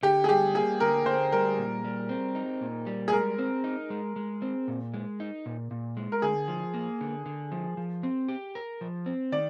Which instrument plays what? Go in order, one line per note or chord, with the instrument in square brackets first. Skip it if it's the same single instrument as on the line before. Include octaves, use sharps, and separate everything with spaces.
[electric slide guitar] D3 [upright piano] G4
[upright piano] G#4
[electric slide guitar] G3 [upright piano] G4
[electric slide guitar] A#3 [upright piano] G#4
[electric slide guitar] D3 [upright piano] A#4
[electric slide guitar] D3 [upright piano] C5
[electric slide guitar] G3 [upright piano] A#4
[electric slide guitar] A#2
G3
C4
D#4
A#2
G3
[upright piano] G#4
[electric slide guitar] G#3 [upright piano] A#4
[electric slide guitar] C4
D#4
G#3
G#3
C4
A#2
G#3
D#4
A#2
A#2
G#3
[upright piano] A#4
[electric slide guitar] D3 [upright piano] G#4
[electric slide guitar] F3
A#3
D3
D3
F3
F3
C4
G4
A#4
F3
C4
[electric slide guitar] D#3 [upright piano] D5